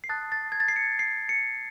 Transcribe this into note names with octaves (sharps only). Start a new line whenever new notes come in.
C7
A5 D#6 F#6 A6
A6
G#6
A6
C7
C#7
C7
C#7